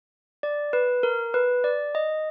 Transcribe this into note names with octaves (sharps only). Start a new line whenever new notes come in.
D5
B4
A#4
B4
D5
D#5